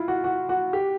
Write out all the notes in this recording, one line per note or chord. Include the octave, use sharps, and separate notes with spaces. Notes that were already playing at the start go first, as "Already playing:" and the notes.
Already playing: E4 F4
F#4
F#4
F#4
G4